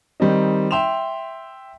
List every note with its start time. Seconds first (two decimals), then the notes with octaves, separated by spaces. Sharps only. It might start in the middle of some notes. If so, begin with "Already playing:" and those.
0.20 D#3 G3 C4 D#4
0.71 E5 G5 C6 E7 F7